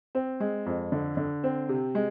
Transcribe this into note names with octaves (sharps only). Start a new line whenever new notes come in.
C4
G#3
F2
D3
D3
C4
C3
G#3